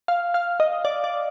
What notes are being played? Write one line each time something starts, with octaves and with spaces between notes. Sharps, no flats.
F5
F5
D#5
D5
D5